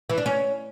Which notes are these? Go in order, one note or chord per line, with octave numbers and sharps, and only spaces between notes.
E3
D4
C#4